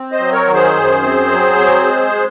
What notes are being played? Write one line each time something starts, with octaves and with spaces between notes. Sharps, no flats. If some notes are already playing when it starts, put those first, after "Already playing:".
Already playing: C4
C5 D#5
F#3
A#4 C#5
D#3
G#4 C5
F#2
C4
F#3
C4
G#3